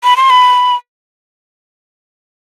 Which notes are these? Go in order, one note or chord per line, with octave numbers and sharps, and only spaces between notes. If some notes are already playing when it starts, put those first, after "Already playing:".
B5
C6
B5